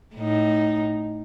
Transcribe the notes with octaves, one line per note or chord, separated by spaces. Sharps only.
A2 D#4